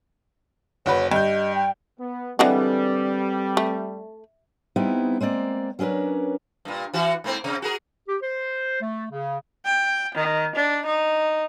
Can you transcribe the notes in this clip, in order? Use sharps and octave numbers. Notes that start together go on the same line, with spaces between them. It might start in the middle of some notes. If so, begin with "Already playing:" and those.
F#1 F#4 B4 C#5
G2 D#5 G6
G5
B3
D3 E3 G3 G#3 C4 A4 B4
A3
G3 B3 C4 D#4 E4
G#3 A#3 C4 D5
F#3 C#4 D4 A#4 B4
G2 A#2
E3 F#4
G#2 A#3 C4
C3
F#4 G#4 A#4
G4
C5
A3
C#3
G5
D#3
D4
D#4